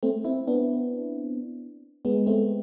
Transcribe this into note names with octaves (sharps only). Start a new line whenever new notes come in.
A3 C4
C4 E4
B3 D4
G#3 B3
A3 C4